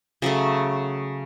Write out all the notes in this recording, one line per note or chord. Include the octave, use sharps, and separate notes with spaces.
C#3 F#3 A3